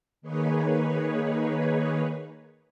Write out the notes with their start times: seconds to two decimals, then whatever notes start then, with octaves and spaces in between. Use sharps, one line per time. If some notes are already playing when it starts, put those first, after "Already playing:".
0.22 D#3 A#3 D#4 G#4 B4 C#5